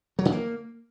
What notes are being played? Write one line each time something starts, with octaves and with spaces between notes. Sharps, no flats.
F#3
C#3
A#3